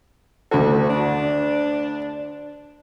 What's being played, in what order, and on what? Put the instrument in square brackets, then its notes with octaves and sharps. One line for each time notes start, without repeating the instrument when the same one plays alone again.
[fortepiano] D2 A4 [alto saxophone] F#4
[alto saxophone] D4